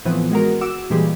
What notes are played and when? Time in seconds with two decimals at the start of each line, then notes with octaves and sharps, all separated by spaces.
0.05 A2 E3 F3 B3 C4
0.31 G#3 F#4 A#4
0.61 F#4 D6 E6
0.90 A#2 E3 G3 G#3